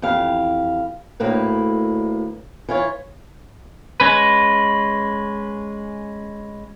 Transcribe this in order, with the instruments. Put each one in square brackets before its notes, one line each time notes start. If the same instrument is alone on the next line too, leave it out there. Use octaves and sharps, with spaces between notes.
[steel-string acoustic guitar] F2 E3 G4 F5
D2 A2 A#3 B4
E3 F4 C#5
[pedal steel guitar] G#3 C#4 B4